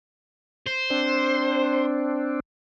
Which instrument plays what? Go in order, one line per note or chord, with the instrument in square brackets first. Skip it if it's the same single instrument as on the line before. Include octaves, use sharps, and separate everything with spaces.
[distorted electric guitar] C5
[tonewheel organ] C4 D4